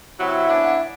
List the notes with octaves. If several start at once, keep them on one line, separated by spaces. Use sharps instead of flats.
C3 F#3 E4 E5 F#5
B3 C#4 D4